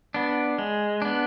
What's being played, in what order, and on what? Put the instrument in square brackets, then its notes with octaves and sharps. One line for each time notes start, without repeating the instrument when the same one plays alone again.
[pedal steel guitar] B3 D4
G#3
B3 D4